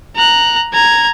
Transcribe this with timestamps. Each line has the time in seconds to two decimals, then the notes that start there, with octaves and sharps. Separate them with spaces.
0.16 A#5 F#6
0.73 A#5 G#6